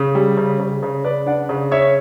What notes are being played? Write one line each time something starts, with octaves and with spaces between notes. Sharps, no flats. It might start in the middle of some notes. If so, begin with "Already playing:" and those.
Already playing: C#3
G3
C#3
C#3
C#3
C#3 B4 D5
D4 D5 F#5
C#3
C#4 C#5 E5